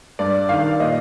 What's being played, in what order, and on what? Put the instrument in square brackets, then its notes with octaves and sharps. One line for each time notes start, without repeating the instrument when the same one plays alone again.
[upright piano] G2 D5
D#3 F5
A#2 D#5